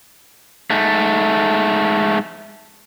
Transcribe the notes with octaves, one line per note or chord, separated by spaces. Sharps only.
G#2 A3